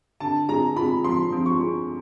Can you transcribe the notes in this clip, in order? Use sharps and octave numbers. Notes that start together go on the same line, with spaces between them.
D3 A5
G#3 A#5
G#3 B5
F3 C6
F3
C#6
G#3